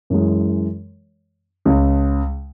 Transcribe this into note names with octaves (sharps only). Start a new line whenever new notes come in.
F#2 E3 G#3
C#2 C#3 G#3